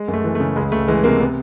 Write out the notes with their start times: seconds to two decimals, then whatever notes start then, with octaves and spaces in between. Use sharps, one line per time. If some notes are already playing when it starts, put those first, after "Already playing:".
Already playing: G#3
0.08 F#2
0.14 A3
0.24 E3
0.35 A3
0.40 C#3
0.56 C#2 G#3
0.72 C#2 A3
0.88 E3 G#3
1.04 C3 A#3
1.20 B3